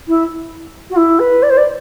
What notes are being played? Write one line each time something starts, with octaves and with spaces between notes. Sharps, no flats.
E4
F#4
E4
B4
D5
C5
D5